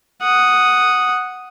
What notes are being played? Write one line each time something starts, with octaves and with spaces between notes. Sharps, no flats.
F#5 D#6